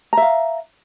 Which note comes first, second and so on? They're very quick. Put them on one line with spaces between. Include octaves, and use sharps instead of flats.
A#5 E5 F5